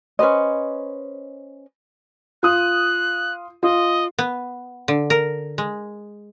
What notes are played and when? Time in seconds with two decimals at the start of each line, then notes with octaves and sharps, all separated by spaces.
0.19 C#4 B4 C5 D#5
2.43 F4 D#6 F#6
3.63 F4 D#5
4.19 B3
4.88 D3
5.10 A#4
5.58 G#3